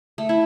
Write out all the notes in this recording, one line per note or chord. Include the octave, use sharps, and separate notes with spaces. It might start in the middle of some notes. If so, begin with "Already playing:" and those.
A3
E4